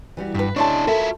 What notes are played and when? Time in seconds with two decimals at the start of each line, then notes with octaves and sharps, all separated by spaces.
0.17 E3 G3 F#4
0.35 G2 B4 E5
0.56 C#3 D4 E4 G#4 A5 C6 C#6
0.87 F4 F#4 A4 A#4 E5 F5